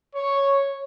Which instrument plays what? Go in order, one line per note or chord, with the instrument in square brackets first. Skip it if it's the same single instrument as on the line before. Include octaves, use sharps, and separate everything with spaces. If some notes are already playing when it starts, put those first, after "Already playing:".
[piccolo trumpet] C#5